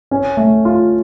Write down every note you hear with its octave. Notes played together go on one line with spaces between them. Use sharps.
C#4
A3
F4